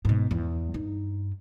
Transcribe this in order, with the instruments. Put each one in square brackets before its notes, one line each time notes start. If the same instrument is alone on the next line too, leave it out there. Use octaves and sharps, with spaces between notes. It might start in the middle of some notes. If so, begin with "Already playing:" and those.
[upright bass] G#2 B2
E2
G2 D#4